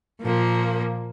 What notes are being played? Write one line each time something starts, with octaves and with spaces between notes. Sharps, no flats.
A#2 F3 A#3